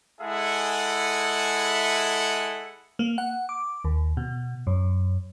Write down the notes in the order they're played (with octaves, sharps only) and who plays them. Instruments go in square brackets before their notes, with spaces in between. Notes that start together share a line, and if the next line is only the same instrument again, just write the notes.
[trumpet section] G#3 E4 G#4 A4 E5 F#5
[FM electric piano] A#3
F#5
D6
D#2
B2
F#2